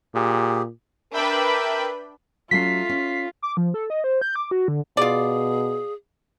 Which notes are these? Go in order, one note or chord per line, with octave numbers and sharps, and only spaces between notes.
A#2 G4 G#4
D4 A#4 B4 E5 G5 B5
F#3 A3 C#4 F4 B6 C7
C#4
D6
F3
A4
D#5
C5
G6
D6
F#4
D3
B2 F4 G#4 D5